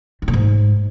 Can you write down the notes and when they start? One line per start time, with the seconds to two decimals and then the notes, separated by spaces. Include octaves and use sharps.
0.22 D#3
0.28 A2
0.33 G#2